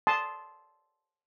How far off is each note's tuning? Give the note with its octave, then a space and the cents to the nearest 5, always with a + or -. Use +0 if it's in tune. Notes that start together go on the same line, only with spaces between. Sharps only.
A5 -10 C6 +0 D#6 +0